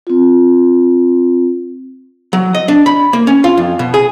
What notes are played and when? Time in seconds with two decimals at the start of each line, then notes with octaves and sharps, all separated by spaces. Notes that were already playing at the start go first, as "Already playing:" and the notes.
0.07 C4 F4
2.33 F#3
2.55 D#5
2.68 D4
2.86 B5
3.13 A#3
3.27 C#4
3.44 F4
3.57 F2
3.79 B2
3.94 G#4